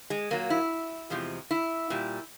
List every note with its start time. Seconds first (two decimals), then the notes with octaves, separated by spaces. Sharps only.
0.10 G#3
0.30 A#2 F#3 A#3
0.50 E4
1.10 E2 C3 F3 G#3
1.51 E4
1.90 A#2 G3